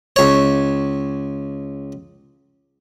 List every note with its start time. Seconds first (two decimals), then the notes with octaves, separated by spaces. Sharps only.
0.16 C#2 C#5